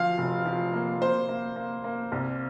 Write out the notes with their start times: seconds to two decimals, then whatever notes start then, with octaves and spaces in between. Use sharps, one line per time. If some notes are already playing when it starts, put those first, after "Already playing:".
Already playing: D2 F3 F5
0.18 F1
0.46 F3
0.73 A#3
1.01 A#3 C5
1.29 A#3
1.56 A#3
1.84 A#3
2.12 C2